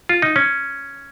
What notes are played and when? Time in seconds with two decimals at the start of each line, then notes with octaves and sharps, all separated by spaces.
0.09 F4
0.22 D#4
0.36 C#4